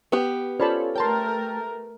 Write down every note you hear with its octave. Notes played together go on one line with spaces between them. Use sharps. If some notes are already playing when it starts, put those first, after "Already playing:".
B3 G4
C#4 F4 A4 C5 D5 B5
A3 A#4 C#5 G5 A5 C6